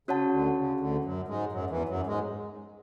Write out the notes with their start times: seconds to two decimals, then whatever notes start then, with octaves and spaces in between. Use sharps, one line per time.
0.08 C#3 C#4 F#4 C#5 F#5 A5
0.32 D2 D3
0.56 C#3
0.80 D2 D3
1.04 F#2 F#3
1.28 G#2 G#3
1.52 F#2 F#3
1.70 E2 E3
1.89 F#2 F#3
2.07 G#2 G#3